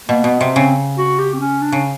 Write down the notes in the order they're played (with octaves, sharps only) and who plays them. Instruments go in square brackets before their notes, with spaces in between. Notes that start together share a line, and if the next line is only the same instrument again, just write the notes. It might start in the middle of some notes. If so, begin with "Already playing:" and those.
[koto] B2 [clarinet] A#3
[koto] B2 [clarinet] B3
[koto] C3 [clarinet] C4
[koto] C#3 [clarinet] C4
[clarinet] F#4
G4
C4
C#4
D4
[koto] C#3